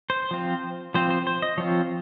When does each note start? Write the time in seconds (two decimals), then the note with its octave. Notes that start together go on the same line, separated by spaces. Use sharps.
0.10 C5
0.31 F3 C4 F4
0.95 F3 C4 F4 C5
1.10 C5
1.27 C5
1.42 D#5
1.58 F3 C4 F4 C#5